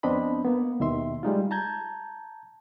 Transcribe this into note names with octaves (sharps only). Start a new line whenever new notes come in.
F2 B3 C4 D4 D#5 B5
A#3 B3
D#2 B2 D#3 E5 C6
G3 G#3 D#4 F4
A5 A#5 G6 G#6